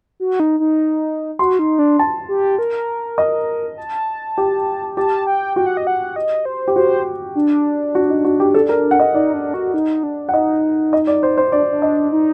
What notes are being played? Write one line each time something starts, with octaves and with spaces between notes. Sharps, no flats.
F#4
D#4
D#4
F#4 C6
D#4
D4
A5
G4
A#4
D#5
A5
G4
G4 A5
G5
F#4 G5
F#5
D#5
F#5
D#5
C5
G4
F#4 C5
D4
F#4
D#4
F#4
G4
A4
A#4
F#5
D#5
D#4 D5
D4
F#4
D#4
D4
F#5
D#4 D#5
D#5
D5
C5
C5
D4 D5
D4
D#5
D#4